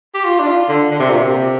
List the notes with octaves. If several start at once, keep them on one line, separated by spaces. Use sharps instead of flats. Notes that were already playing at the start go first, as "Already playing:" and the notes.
G4
F4
D4
F4
D3
D3
C3
A#2
C3